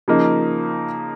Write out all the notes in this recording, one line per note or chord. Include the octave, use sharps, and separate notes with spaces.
C#3 F3 A#3 D#4